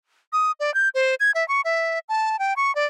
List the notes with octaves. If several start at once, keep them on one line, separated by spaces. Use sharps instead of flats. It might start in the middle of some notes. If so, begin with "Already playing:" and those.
D#6
D5
G6
C5
G#6
E5
C#6
E5
A5
G5
C#6
D5